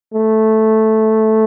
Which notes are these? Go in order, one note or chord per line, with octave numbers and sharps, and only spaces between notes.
A3